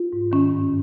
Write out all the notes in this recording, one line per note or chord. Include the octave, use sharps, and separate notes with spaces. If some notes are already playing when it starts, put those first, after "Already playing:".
Already playing: F4
G#2
D#3 C#4
G2